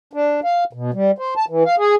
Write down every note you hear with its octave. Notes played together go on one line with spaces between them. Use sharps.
D4
F5
B2
G3
C5
A5
E3
F5
G#4